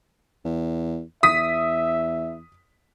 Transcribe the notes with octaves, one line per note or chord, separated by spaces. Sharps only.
E2
E2 E5 D#6 B6